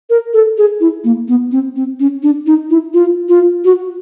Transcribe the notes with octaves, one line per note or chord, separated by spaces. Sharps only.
A#4
A4
G#4
E4
A#3
B3
C4
C4
C#4
D4
D#4
E4
F4
F4
F#4